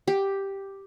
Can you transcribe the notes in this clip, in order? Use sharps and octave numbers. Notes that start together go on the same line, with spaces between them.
G4